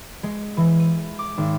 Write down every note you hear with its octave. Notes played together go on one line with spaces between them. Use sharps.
G#3
E3
D#7
D6
G#1